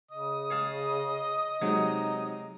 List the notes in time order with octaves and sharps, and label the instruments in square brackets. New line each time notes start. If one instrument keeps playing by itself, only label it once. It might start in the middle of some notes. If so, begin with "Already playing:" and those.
[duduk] C#3 [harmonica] D#5 D#6
[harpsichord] G#4 F5 A5
[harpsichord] C3 F#3 G#3 [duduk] D#4